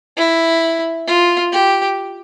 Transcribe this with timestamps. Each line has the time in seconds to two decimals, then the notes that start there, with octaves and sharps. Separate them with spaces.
0.17 E4
1.08 F4
1.52 G4